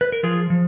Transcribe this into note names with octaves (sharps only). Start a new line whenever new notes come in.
B4
A#4
F3 F4 G#4
F3